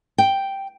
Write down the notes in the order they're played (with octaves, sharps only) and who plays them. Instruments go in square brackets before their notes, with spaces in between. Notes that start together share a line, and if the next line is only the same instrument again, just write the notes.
[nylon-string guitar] G5